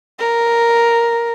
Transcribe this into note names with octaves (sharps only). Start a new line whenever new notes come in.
A#4